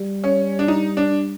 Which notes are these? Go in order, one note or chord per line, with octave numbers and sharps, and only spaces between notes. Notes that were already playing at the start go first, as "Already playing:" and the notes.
Already playing: G3
C#4
D4
D#4
D4